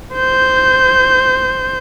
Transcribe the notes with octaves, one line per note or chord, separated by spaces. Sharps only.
C5 G6